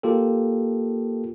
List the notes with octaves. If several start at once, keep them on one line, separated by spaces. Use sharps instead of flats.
A#3 F4 G4 A4